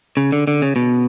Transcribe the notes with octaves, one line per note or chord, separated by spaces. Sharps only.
C#3
D3
D3
C#3
B2